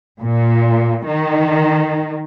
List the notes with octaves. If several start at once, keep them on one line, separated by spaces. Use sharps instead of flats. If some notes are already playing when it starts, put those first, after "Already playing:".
A#2
D#3